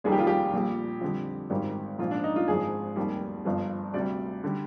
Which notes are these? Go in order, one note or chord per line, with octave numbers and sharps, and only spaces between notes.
F1 D#2 D#3 G3 G#4
G4
F4
G4
A#1 A#2 G3
F2 D3 G3
G#1 G#2 D#3 G3
A#1 G#2 F3 F4
D4
D#4
F4
G#1 G#2 F3 G#4
F1 D#2 D#3 G3
G1 G2 F3
D2 C3 G3 D5
D3 G3